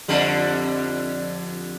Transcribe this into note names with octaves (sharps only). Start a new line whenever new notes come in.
F2 D3 G3